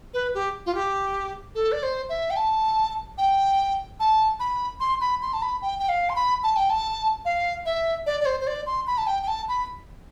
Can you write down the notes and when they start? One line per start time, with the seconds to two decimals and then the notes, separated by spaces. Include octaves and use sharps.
0.14 B4
0.34 G4
0.66 F4
0.75 G4
1.55 A4
1.72 D5
1.83 C5
2.09 E5
2.30 G5
2.36 A5
3.18 G5
4.00 A5
4.40 B5
4.80 C6
5.01 B5
5.22 C6
5.33 A5
5.42 B5
5.62 G5
5.79 G5
5.89 F5
6.09 C6
6.16 B5
6.44 A5
6.56 G5
6.70 A5
7.25 F5
7.66 E5
8.06 D5
8.21 D5
8.26 C5
8.40 C5
8.47 D5
8.66 C6
8.87 B5
8.98 A5
9.07 G5
9.23 G5
9.28 A5
9.49 B5